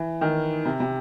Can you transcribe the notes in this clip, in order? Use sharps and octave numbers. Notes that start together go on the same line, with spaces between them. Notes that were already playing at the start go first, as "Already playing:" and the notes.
Already playing: E3
D#3
C3
C3